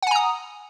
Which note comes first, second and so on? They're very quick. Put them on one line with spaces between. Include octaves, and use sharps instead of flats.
F#5 G#5 A#5 D#6